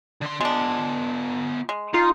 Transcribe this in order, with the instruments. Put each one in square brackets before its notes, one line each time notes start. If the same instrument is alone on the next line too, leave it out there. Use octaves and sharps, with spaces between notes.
[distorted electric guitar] D3 C6
[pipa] G#3 D4 [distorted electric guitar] B3 F4
[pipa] G#3
[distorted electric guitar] D#4 [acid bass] F4